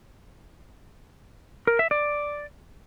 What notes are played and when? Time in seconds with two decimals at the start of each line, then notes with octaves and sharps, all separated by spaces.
1.67 A#4
1.79 E5
1.91 D5